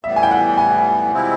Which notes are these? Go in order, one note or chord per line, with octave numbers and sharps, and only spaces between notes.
A2 E3 G3 B3 E5
G#5
G5
F#5
G#5
C3 F3 G#3 C4 E4